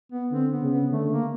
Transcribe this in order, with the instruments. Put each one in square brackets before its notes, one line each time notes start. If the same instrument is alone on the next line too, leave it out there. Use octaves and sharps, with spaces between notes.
[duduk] B3
[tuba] D3 [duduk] C4
[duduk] B3
[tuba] C#3
[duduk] B3
[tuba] D3 [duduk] A3
[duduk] A#3